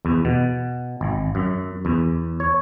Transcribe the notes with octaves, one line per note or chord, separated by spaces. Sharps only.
E2
B2
G#1
F#2
E2
C#5